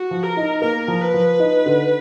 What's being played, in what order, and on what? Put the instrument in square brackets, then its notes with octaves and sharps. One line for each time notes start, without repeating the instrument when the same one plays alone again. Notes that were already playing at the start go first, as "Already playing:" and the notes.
Already playing: [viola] F#4
[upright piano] F3
[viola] A#4
[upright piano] D#4
[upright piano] A#3 [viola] A#4
[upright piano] F3
[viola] B4
[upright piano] F3
D#4
D3